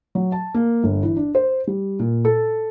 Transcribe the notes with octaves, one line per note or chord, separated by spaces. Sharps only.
F#3
A5
A#3
G1
E3
D4
C5
G3
A#2
A4